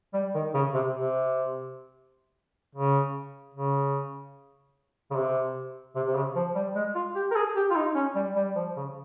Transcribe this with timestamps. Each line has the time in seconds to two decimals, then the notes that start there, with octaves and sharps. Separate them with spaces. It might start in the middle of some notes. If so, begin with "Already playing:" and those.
0.14 G3
0.35 D#3
0.54 C#3
0.74 C3
0.94 C3
2.75 C#3
3.54 C#3
5.11 C#3
5.15 C3
5.95 C3
6.07 C3
6.15 C#3
6.35 F3
6.55 G3
6.76 G#3
6.95 F4
7.16 G4
7.31 A#4
7.35 G#4
7.56 G4
7.71 F4
7.76 D#4
7.95 C#4
8.15 G3
8.36 G3
8.56 F3
8.76 C#3